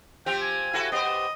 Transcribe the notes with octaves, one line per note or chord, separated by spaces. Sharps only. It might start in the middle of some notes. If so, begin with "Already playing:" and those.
F3 C4 G4 G5
G#5
E4 F#4 A4
B3 G4 C5 D#5